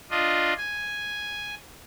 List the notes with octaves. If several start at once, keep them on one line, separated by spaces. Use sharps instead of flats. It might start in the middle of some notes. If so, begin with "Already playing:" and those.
D4 F4 D#5
G#5